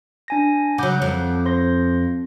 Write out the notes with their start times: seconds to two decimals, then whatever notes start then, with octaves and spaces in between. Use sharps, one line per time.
0.28 D4 G#5 A#6
0.78 C#3 F#3 F#5 D6 G6
1.02 F2
1.45 C5 C6 A#6